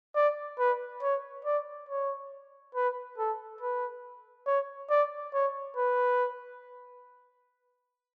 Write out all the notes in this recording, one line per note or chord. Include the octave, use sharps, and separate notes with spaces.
D5
B4
C#5
D5
C#5
B4
A4
B4
C#5
D5
C#5
B4